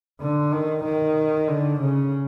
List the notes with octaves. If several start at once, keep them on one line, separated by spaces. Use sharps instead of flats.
D3
D#3
D#3
D3
C#3